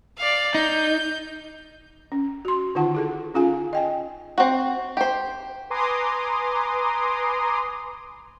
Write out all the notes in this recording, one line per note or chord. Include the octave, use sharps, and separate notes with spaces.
D5 F5
D#4 G6
C#4
F#4 C6
D3 D#3 D#4 F4 F#5 A5
E4 G#4 A4
C#4 D#4 F4 G#4 F5 G#5
D#5 G5 G#5
C4 F#4
G4 C5
B4 G#5 A#5 C6 D6 D#6